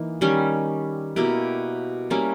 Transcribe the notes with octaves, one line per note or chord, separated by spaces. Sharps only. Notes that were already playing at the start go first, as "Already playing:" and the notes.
Already playing: E3 A#3 D#4
D#3 G3 C#4
B2 A#3 E4 G4
G3 A#3 C#4 E4